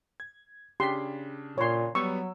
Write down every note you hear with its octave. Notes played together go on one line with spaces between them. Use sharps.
G#6
C#3 D4 G4 C6 B6
A#2 C#5 C6
F#3 G3 B3 C#6 E6